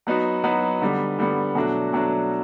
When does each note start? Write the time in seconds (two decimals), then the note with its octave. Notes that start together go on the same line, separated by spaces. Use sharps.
0.07 F#3 B3 D#4 F#4
0.44 F#3 B3 D#4 F#4
0.82 D3 G3 B3
1.19 D3 G3 B3
1.55 B2 F#3 A3 D4 F#4
1.93 B2 F#3 A3 D4 F#4